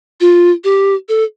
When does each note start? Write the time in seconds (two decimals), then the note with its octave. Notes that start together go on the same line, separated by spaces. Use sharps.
0.20 F4
0.64 G4
1.09 A4